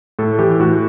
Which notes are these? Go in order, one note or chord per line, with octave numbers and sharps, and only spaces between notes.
A2 A4
E3 G4
A2 F#4